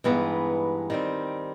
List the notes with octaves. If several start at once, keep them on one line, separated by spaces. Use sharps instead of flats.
G2 E3 G#3 B3 D#4
D#3 G3 C4